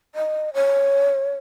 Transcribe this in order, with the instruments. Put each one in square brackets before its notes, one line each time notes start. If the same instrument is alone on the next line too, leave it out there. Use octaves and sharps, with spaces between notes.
[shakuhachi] D#5
C#5